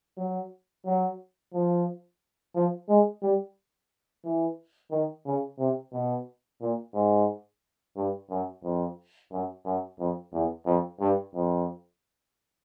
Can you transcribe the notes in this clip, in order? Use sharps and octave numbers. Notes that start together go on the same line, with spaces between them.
F#3
F#3
F3
F3
G#3
G3
E3
D#3
C#3
C3
B2
A#2
G#2
G2
F#2
F2
F#2
F#2
F2
E2
F2
G2
F2